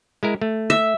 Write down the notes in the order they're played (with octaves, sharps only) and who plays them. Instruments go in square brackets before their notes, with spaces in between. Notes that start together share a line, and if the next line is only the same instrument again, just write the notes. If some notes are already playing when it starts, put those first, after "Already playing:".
[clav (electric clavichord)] G#3 E4 A#4
A3
[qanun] E5